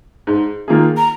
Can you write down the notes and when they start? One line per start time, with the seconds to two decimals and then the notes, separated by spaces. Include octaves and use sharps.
0.27 G#2
0.68 D#3 A#3 F4 G#4
0.97 A#5